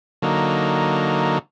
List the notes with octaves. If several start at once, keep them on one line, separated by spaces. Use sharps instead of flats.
D3 F#3 A#3 D#4